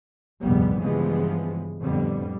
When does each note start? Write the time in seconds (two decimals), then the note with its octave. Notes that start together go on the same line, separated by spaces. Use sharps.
0.43 F1 A#1 D#2 G#2 G3 B3
0.80 G2 C#3 E3 F3 G#3 B3
1.81 F2 A2 D3 G3 B3